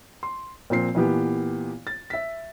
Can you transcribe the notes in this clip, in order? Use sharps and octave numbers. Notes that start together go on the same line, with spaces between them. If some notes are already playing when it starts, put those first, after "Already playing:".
C6
A#2 F3 C4 C7
A#2 E3 B3 G4
A6
E5 B6